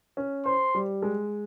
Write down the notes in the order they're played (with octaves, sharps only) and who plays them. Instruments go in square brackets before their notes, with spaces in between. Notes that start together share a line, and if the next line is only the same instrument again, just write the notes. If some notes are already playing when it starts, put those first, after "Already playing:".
[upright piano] C#4
[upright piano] C5 [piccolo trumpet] C6
[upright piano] G3
G#3